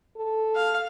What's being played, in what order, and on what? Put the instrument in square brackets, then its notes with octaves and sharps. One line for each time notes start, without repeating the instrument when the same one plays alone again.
[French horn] A4
[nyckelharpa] F5